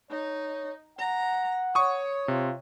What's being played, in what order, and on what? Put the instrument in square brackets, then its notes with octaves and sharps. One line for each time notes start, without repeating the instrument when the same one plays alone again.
[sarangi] D#4 [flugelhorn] C#5
[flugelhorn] F#5 [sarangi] A#5
[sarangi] C#5 [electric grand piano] C#6 D#6
[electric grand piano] C3 [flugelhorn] F4